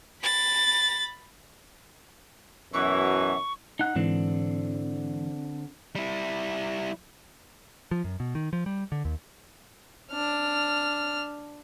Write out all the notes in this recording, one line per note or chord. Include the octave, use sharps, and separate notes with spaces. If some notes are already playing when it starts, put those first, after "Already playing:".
B5 A6
F#2 B2 E3 C#6
D#4 F#5
G#2 D3 E3 C4
G3 E4
F3
F#2
B2
D#3
F3
G3
D3
D#2
D4 F6